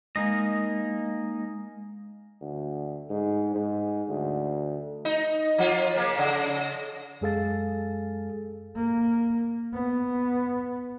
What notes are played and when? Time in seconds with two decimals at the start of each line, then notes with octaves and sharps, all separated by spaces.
0.16 G#3 A#3 D#4 D#5
2.41 D2
3.10 G#2
3.55 G#2
4.09 D2
5.05 D#4
5.58 F3 F4
5.94 C#3 A#3
6.18 C#3
7.21 F#2 G#3 G#4 A4 F5 A6
8.76 A#3
9.73 B3